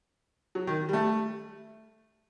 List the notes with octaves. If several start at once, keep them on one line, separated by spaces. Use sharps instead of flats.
F#3
D#3
G3
A3